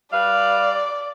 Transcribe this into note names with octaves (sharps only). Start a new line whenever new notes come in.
G3 B4 D5 F5